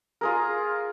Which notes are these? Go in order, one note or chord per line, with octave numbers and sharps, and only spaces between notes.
F4 G#4 A#4